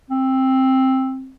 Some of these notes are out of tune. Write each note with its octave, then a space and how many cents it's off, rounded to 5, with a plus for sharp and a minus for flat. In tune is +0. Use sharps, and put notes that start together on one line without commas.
C4 +10